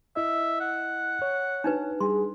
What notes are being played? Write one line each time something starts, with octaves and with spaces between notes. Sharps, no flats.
E4 D#5 E5
F#5
C#5
D4 D#4 B4
G3 G#4 C6